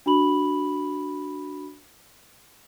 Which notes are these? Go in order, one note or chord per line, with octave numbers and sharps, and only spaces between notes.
D4 F#4 B5 F#7